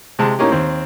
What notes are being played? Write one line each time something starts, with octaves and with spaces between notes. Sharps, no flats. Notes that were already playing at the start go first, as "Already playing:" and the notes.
C3 G#3 A5
A2 A#3 C#4 D#4 G4
D#2 C4